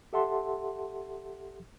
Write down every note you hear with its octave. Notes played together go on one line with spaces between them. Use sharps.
G4 A4 E5 F#5 A5 C6